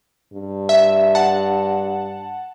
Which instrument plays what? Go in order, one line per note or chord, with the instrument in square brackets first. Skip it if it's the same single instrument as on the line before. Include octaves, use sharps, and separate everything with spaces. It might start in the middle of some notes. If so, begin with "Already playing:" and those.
[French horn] G2
[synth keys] E5
F#5 A5